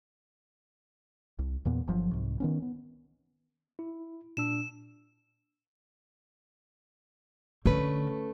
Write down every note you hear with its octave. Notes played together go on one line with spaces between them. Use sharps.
C2
E2 A#2 B3
G1 F3 F#3
C2 G#2
D#3 B3 C#4
B3
E4
A#2 D4 E6 E7
D3 A3 C#4 B4